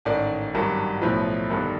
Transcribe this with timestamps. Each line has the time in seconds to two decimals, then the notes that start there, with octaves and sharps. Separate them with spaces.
0.05 A1 G#2 D#3 D5
0.54 G#1 G2 D#3 F#3 A#3
1.01 B1 A2 F3 B4
1.50 G1 G2 D#3